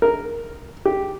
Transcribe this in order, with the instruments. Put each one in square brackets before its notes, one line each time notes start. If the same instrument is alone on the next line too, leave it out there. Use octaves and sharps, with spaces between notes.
[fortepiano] A#4
G4